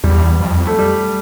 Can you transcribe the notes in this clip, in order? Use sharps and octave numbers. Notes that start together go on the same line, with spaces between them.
E2 G3
F2
A3
G3